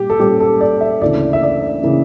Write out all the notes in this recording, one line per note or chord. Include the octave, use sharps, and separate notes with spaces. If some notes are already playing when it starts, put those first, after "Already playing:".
Already playing: A#2 G3 G4
A4
A#2 G3 C#4 G4
A4
D5
E5
D2 C#3 E3 A#3 D5
E5
D5
C#3 E3 A#3